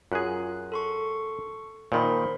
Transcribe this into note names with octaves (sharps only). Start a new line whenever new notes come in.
F#2 F4 G#4 F#6
A4 C6 C#6
A#2 D#3 C5 B5 C6